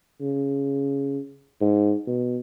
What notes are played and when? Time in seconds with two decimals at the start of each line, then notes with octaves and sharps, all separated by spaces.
0.21 C#3
1.61 G#2
2.07 B2